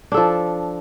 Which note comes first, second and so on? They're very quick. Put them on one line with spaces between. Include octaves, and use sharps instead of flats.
D4 A4 F3